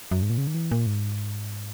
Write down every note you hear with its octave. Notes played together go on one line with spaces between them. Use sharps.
F#2
G#2
A#2
C#3
D#3
E3
A#2
G#2